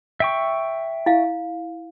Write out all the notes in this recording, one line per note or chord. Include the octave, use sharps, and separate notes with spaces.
E5 G5 C#6
E4 F5